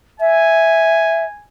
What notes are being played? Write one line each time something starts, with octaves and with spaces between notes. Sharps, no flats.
E5 G#5